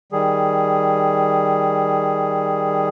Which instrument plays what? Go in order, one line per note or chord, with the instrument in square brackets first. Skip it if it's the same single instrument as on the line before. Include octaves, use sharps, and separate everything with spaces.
[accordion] D#3 G3 G#4